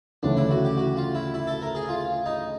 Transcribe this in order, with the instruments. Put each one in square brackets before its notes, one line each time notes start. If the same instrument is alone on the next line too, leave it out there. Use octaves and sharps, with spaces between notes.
[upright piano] D2 C#3 E3 A3 C#4 [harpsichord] D4
[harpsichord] E4
F#4
G4
F#4
F4
E4
E4
A4
A#4
G#4
F4
D#4